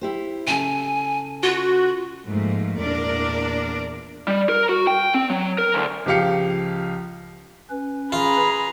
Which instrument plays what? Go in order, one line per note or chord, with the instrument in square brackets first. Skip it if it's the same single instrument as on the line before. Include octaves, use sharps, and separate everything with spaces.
[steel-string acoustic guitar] E4 G4 C5
[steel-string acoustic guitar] C#3 A4 [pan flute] G#5
[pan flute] F4 [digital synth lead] F#4
[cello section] G#2 F3 A3 A#3
E2 A#2 D4 A#4 D5
[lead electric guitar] G3
A#4
F#4
G5
C4
F#3
A#4
D2
[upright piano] C#2 F3 G4 F5 C#7
[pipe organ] C#4 B4
[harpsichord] F4 [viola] G#4 A#5 [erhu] B5